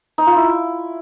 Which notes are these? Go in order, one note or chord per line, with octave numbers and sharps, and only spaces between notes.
D#4
F4
E4